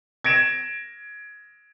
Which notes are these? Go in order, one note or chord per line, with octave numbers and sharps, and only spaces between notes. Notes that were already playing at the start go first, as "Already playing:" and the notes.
G#6 A#6 D7 E7